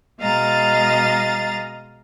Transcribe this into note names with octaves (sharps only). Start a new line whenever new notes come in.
B2 G#3 D#5 F5 A#5 A6